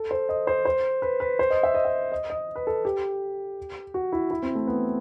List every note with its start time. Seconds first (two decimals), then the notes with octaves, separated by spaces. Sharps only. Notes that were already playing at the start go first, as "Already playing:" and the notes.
Already playing: A4
0.11 C5
0.29 D#5
0.47 C5
0.65 C5
1.02 B4
1.20 B4
1.39 C5
1.50 D#5
1.63 E5
1.74 D#5
1.85 E5
2.12 D#5
2.30 D#5
2.56 B4
2.67 A4
2.85 G4
3.94 F#4
4.12 E4
4.30 E4
4.43 C4
4.55 A3
4.67 B3